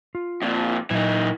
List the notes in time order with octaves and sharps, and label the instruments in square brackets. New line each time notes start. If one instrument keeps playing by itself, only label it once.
[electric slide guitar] F4
[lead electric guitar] F2 A#2
[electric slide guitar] A#2 F#3 G#5 [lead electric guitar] E3 D#4